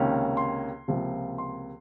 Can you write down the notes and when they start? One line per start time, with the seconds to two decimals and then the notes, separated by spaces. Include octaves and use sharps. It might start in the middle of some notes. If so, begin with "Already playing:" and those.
Already playing: C#2 C3 D#3 A#3 C#4
0.37 C6
0.88 C#2 C3 F3 A#3 F4
1.38 C6